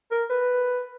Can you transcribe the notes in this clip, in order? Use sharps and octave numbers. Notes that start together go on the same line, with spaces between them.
A#4
B4